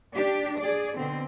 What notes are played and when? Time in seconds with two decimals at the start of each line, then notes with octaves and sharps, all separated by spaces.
0.15 D4 G4
0.58 G#4 D5
0.97 B2 D3 C4